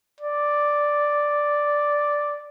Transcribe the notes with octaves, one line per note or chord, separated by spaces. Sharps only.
D5